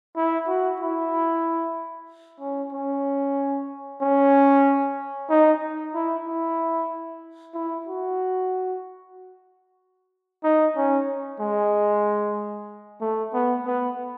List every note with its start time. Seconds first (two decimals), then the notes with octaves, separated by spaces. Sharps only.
0.16 E4
0.48 F#4
0.80 E4
2.40 C#4
2.73 C#4
4.01 C#4
5.30 D#4
5.95 E4
6.27 E4
7.54 E4
7.87 F#4
10.44 D#4
10.77 C#4
11.40 G#3
13.01 A3
13.33 B3
13.66 B3